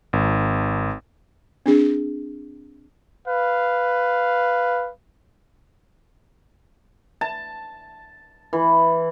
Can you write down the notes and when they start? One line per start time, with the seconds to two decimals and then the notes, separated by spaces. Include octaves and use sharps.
0.13 G#1
1.66 C4 D4 G#4
3.28 B4 F5
7.21 A5
8.53 E3